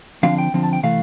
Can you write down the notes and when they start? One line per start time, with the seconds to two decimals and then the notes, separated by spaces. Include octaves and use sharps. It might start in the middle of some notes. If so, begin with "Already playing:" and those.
0.23 D3 F3 C4 F5
0.38 G5
0.54 D3 F3 C4
0.63 A5
0.73 G5
0.83 C3 E3 A3 F5